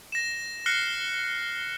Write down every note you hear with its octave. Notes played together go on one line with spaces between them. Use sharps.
A#6 E7
F6 F#6 A#6 C7 C#7 G7